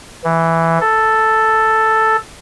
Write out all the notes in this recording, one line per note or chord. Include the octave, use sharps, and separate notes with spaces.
E3
A4